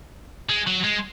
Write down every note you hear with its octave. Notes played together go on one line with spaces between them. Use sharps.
G#3
F#3
G#3